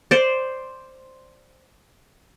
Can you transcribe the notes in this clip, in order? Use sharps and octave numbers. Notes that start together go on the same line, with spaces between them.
C5 D5